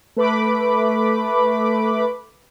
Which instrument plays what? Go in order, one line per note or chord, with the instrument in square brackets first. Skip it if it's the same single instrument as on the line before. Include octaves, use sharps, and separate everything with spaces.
[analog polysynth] A3 B4 B5 D6